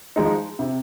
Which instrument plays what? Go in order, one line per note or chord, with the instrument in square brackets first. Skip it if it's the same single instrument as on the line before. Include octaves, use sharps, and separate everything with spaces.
[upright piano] F3 G#3 D#4
C3